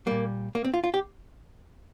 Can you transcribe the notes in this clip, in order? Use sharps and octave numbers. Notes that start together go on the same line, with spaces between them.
A#2 G3 A#3
A#3
C4
F4
F4
G4